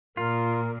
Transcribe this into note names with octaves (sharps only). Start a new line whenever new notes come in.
A#2 F4 A#4